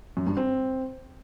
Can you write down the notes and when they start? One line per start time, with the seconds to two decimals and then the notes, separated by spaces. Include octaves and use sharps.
0.17 F#2
0.27 G2
0.37 C4